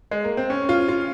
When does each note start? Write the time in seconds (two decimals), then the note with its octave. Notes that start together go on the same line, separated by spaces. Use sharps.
0.11 G#3
0.24 A#3
0.37 C4
0.50 C#4
0.69 F4
0.88 F4